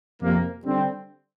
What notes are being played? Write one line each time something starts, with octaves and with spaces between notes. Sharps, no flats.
F2 C3 A#3
D3 G3 C4